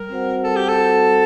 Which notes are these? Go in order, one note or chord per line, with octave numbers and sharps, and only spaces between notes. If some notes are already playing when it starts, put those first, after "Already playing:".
Already playing: G3 A#4
C4 F#4 C5 F#5
G3 A4
G4
A4
C4 F#4 C5 F#5
G3